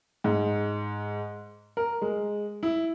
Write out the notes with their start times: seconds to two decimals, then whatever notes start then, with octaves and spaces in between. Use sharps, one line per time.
0.24 G#2
1.77 A#4
2.02 G#3
2.63 E4